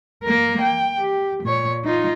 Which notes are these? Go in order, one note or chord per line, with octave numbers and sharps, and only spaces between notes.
A#3 A#4
G5
G4
A#2 C#5
D#4 F4